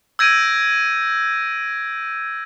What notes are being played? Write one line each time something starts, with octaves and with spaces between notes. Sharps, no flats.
E6 G6 G#6 A#6 D7 D#7